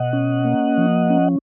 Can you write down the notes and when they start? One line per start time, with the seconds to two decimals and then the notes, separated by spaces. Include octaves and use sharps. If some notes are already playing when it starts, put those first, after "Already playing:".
Already playing: B2 D#5 F#5
0.13 C#4
0.44 A#3
0.77 F3
1.10 C#4